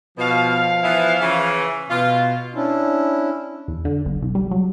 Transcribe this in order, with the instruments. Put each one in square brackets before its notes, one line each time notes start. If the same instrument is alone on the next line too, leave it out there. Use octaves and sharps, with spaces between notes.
[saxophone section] B2 [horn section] F3 F5
[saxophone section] E3 B3 E4
C#3 E3
[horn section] B2 [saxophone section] F4
[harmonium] C#4 D4 E4
[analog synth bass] E2
D3
G1
C2
G3
F#3